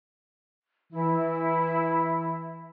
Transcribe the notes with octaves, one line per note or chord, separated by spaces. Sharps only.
E3 E4